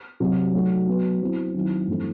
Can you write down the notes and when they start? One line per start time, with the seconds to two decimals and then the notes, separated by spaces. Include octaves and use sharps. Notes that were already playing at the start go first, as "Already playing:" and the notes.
0.20 C3 F#3 C4
0.53 F#3 A3 D#4 F#4
0.87 F#3 B3 F#4 B4
1.21 F#3 C4 E4
1.54 D#3 F#3 C4 E4
1.87 G2 E3 A3 C4 E4